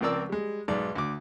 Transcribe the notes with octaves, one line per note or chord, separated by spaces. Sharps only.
C#2 F3 C4 A#4 D5 E6
G3 G#3
B1 G#2 D5
D2 D6